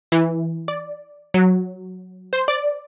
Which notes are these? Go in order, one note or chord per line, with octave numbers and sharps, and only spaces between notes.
E3
D5
F#3
C5
D5